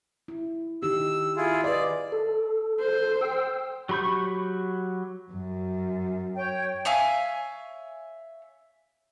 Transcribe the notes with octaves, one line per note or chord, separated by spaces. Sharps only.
E4
D#3 D#4 G4 E6
E4 F4 G#4
B4 D5 D#5
A4
C5
G5 E6
F#3 G4 B5 C#6 G6
F#2
C#5 G5
C#5 E5 F5 G#5